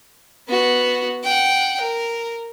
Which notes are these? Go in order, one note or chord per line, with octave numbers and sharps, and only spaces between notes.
B3 F#4
F#5 G5
A#4